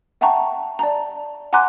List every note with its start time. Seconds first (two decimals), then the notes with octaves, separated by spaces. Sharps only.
0.21 E5 F#5 G5 A5 A#5 C#6
0.79 D5 A5 A#5
1.53 F#5 G#5 A#5 C6 D6 F#6